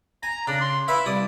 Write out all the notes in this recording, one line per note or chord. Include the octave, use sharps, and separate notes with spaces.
G#5 A#5
C#3 D4
C6
E4 B4 E5 F5
C2 D5 D#6